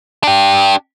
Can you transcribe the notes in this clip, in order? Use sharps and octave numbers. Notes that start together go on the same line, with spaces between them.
D4 G4